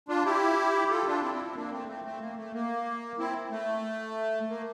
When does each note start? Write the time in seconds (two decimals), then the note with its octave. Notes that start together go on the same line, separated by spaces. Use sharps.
0.08 D4 F4
0.25 E4 G4
0.90 F4 A4
1.06 D4 F4
1.22 C4 E4
1.34 C4 E4
1.45 C4 E4
1.55 A#3 D4
1.72 A3 C4
1.88 A3 C4
2.05 A3 C4
2.20 A#3
2.37 A3
2.54 A#3
3.19 C4 E4
3.51 A3
4.49 A#3